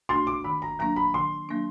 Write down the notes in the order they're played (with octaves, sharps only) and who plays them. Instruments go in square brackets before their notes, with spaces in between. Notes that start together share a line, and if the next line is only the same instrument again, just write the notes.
[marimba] A3 D4 F#4 [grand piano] C6
[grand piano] D6
[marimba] D#3 [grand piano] B5
[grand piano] A#5
[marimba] F#3 A#3 D4 [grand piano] A#5
[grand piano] B5
[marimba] D#3 [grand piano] C6
[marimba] F#3 A#3 D4